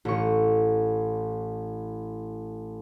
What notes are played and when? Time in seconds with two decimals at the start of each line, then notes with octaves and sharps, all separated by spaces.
0.05 A1 C#6